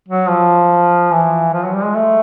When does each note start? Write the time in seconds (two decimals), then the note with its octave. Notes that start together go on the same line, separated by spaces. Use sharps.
0.08 F#3
0.29 F3
1.12 E3
1.53 F3
1.64 F#3
1.75 G3
1.84 G#3
1.96 A3